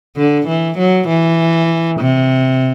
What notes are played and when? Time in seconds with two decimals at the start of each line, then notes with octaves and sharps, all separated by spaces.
0.17 D3
0.48 E3
0.78 F#3
1.08 E3
2.01 C3